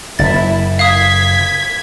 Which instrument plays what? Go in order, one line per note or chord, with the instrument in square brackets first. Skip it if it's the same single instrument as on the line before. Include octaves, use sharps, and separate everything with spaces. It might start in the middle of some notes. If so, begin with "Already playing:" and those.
[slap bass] F#1 [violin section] E4 [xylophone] A6
[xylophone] F5 D#6 [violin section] G#6 B6